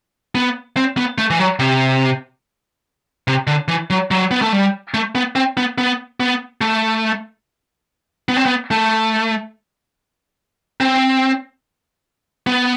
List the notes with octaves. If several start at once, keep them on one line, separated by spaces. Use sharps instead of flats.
B3
C4
B3
A3
E3
F#3
C3
C3
D3
E3
F#3
F#3
B3
A3
G3
A3
B3
C4
B3
B3
B3
A3
B3
C4
B3
A3
C4
B3